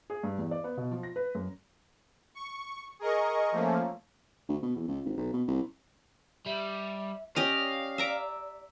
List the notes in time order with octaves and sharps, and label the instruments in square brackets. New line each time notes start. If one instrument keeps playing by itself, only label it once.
[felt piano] G#4
G2
E2
D5
B3
B2
F3
A#6
B4
F#2
[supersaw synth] C#6
G#4 A#4 D#5 C#6
F3 A3 A#3 C#4
[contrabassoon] D2
B2
E2
C#2
G#1
B1
B2
C2
[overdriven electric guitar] G3 [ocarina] E5
[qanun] C#4 G4 D#5 [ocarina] D5 [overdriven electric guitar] F5
[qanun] E5 A#5 D6